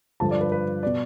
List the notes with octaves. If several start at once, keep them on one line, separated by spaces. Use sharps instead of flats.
G2 D3 F3 A5
D5
B4
B4
B2 D5